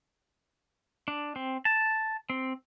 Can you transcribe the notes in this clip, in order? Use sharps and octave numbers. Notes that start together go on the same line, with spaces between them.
D4
C4
A5
C4